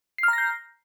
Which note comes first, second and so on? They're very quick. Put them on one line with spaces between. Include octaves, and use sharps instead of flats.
C7 F6 A#5 A#6 G6